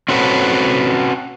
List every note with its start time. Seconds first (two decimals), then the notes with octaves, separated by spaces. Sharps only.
0.09 C4 C#4 F#4 A4 B4